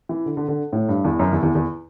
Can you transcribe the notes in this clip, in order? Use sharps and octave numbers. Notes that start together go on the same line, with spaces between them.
E3
D3
D3
D3
A2
G2
E2
F#2
E2
E2
E2